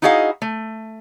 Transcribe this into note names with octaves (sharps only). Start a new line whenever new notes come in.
D#4 E4 F#4 G#4 D#5 F5
A3